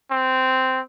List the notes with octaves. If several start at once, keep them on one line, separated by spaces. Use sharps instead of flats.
C4